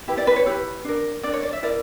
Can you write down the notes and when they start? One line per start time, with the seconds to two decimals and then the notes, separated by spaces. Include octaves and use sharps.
0.08 E4 G4 B4
0.17 D5
0.27 B4
0.36 C#5
0.46 E4 G4 B4
0.85 D4 A#4
1.23 D4 A#4 D5
1.33 C#5
1.43 D5
1.53 E5
1.62 E4 A#4 D5